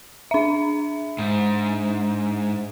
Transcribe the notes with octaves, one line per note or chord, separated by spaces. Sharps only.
D4 E5
G#2